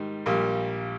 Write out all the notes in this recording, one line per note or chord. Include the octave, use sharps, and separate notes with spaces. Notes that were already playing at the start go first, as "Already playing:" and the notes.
Already playing: G#2 D#3 G3
A#1 A#2 G3